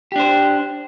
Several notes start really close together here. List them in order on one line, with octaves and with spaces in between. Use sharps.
G4 D4 C5